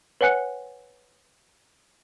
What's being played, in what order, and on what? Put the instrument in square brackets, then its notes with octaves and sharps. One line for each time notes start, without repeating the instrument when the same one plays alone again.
[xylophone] B4 C#5 F#5 G#5 F#6 C#7